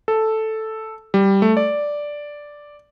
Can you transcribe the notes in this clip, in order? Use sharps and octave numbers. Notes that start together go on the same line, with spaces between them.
A4
G3
A3
D5